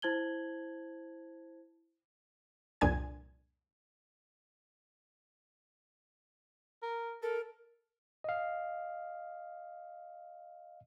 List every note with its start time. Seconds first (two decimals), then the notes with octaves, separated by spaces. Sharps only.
0.02 E4 C5 A5 G#6 F#7 G7
2.81 C2 F2 A#2 D4 G#5 G#6
6.82 A#4
7.23 A4 A#4
8.24 D#5 F5